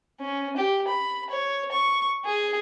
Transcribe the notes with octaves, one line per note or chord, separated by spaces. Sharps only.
C#4
G4
B5
C#5
C#6
G#4